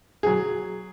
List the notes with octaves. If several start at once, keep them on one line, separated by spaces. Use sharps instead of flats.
F#3 G#4